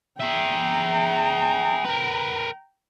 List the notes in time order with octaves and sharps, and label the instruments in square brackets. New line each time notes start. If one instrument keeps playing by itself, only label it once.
[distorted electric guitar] G#4 E5 [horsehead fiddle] G5 A#5
[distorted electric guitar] A#4 B4